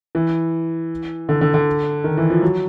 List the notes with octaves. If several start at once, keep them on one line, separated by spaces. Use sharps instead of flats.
E3
D3
D3
D3
D#3
E3
F3
F#3